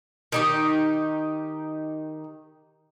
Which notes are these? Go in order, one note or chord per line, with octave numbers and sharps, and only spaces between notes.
D#3 D#4 G4